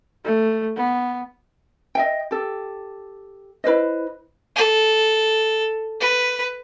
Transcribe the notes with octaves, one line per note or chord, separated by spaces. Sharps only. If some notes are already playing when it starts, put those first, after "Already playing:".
A3
B3
D#5 E5 G5
G4 A4
E4 B4 C5 D#5
A4
B4